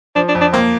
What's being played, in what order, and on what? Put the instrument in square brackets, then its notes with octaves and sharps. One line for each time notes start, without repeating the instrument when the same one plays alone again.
[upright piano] F3 [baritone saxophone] D4
[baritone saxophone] D4
[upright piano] F2
[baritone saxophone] D4
[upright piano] A#3 [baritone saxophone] C4